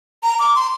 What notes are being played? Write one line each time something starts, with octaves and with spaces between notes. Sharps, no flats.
A#5
D6
C6